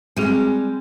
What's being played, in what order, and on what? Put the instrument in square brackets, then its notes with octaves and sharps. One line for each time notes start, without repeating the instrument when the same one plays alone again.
[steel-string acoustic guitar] G3 G#3 [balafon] C4 F#4 G#4